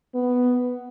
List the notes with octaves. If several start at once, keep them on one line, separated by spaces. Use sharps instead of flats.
B3